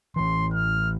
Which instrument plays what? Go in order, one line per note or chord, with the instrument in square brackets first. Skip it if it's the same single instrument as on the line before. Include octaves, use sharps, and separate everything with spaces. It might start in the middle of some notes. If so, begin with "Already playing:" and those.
[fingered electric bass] A1 E3 [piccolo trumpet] C6
[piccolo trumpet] F6